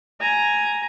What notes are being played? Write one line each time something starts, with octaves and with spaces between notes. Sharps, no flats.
G#5 A#5